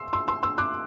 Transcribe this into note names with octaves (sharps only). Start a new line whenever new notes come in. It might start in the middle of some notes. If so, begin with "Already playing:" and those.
Already playing: C6 E6
C6 E6
C6 E6
C6 E6
D6 F#6